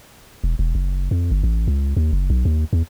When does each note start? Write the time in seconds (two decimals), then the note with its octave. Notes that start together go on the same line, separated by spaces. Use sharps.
0.44 E1
0.59 E1
0.75 F#1
1.11 F2
1.31 G1
1.43 A1
1.68 C#2
1.97 D#2
2.13 F#1
2.30 B1
2.45 D#2
2.73 E2